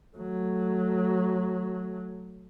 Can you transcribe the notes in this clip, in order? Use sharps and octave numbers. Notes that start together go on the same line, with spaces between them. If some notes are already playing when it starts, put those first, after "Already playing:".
F#3 A3